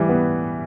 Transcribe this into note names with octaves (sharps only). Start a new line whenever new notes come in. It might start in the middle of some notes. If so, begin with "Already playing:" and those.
Already playing: E3 G3
B3